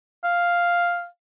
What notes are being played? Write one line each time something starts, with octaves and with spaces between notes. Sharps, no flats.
F5